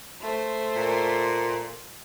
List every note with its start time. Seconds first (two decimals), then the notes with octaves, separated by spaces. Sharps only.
0.20 A3 C5
0.76 A#2